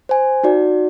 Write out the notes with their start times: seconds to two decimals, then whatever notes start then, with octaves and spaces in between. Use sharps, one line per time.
0.09 C5 G#5
0.44 D#4 F#4 D5